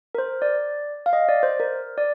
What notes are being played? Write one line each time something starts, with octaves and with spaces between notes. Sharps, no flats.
A#4
C5
D5
F5
D#5
D5
C5
A#4
D5